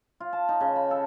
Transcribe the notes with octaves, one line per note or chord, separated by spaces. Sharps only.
F4
A5
D#4
C#3
B5
A4